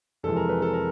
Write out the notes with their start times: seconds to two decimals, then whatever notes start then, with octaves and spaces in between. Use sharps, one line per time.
0.23 F2 C3 E3 G#3 A4
0.36 A#4
0.49 B4
0.62 A4
0.73 A#4